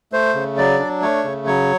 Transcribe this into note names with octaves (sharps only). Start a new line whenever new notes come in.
A3 C5
C#3
F#3 D5
D4
A3 C#5
C#3
F#3 C#5